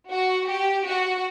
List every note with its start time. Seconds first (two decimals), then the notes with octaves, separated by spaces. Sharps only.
0.11 F#4
0.48 G4
0.86 F#4